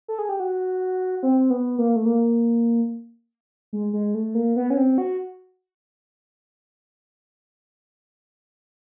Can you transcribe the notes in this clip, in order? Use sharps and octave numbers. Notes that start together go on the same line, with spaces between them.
A4
G#4
G4
F#4
C4
B3
A#3
A3
A#3
G#3
G#3
A3
A#3
B3
C#4
C4
F#4